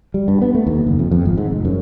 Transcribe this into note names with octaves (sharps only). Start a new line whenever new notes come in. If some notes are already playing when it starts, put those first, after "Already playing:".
G3
G2
B3
A3
D#2
F#1
F2
F2
G#1
G#2
F1
F#2